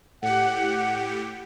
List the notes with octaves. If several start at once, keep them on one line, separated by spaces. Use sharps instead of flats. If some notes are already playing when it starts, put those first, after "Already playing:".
A2 G4 F#5